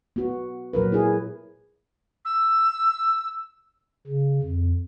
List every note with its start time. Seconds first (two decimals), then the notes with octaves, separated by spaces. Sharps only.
0.16 B3 F#4
0.73 A#2 F#3 A#4 B4
0.92 E4 G#4
2.25 E6
4.07 C#3
4.43 F2